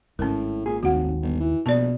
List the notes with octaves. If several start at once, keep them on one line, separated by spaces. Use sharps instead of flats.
G#1 A2 C#4 A#4
A#2 G#4
F1 D#2 F#4 F#5
G1
E3
A#1 B2 D5 A5